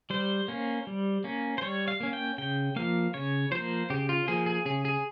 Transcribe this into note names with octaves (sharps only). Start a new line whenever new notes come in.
G3 C5
A#3 C#4
G3
A#3 C#4
C5
G3 C#5
F5
A#3 C#4
G5
C#3 G5
F3 A#3 F5
C#3 C#5
F3 A#3 C5
C#3 G4
F4
F3 A#3 G#4
G#4
C#3 G#4
G#4